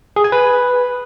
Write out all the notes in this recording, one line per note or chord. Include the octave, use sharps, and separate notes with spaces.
G#4
G#5
B4